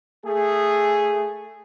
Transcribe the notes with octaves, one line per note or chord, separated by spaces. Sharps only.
A3 G#4